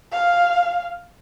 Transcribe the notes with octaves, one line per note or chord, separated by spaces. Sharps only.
F5